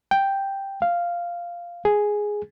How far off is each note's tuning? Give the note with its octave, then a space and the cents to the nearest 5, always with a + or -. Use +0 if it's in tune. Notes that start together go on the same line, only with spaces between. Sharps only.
G5 +0
F5 -5
G#4 +0